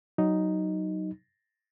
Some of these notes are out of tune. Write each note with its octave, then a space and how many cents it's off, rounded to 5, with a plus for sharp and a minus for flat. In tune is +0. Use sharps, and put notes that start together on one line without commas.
F#3 +15 D#4 +0